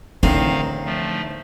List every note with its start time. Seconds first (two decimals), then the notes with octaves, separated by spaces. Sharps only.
0.23 E2 A2 D3 D#3 C4 D#4 F5 A#5
0.86 F3 A3